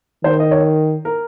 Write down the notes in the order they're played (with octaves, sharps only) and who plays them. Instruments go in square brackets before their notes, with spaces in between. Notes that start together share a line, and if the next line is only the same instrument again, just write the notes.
[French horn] D#3 [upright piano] C5
[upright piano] D#5
C#5
A#4